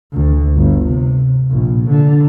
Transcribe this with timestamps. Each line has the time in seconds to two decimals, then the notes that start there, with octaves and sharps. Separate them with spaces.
0.12 D2
0.56 G1
0.87 C3
1.50 A#1
1.89 D3